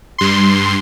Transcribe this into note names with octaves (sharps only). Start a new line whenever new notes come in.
G2 C6